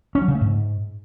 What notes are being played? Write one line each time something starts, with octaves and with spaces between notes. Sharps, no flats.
C#4
F#3
C#3
A3
G#2